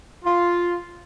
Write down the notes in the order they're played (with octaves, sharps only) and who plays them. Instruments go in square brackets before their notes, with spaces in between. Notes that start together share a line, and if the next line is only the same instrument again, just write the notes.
[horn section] F4